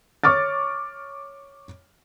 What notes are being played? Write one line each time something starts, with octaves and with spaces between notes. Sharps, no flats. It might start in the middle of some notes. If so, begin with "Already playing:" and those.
C#5 C#6 D6 F6 A6